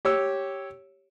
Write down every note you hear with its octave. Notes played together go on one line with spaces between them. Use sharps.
G4 C#5 E6